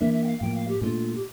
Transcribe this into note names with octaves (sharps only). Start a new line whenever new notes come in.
E3 A#3 D4 E5
E5
G5
F5
A2 F3 A#3 G5
F5
G4
A#2 A3 D4 F4
G4